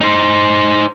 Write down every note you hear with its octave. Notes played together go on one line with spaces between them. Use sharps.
D#4 C5